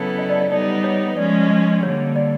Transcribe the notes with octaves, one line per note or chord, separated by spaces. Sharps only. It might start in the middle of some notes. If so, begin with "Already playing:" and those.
Already playing: C#3 F#3 B3 E4 A4
D#5
D5
D5
G3 B3 D#4 D5
C#5
F3 G#3 C#4 D5
D#5
D3 G3 A#3 C#5
D5